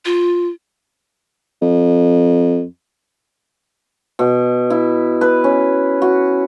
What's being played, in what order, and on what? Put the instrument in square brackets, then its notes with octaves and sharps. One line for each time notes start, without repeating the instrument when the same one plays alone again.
[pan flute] F4
[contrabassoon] F2
[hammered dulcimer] B2
E4
B4
C#4
F#4